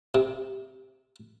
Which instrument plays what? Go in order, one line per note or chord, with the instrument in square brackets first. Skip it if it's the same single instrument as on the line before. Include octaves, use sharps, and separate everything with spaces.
[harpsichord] C3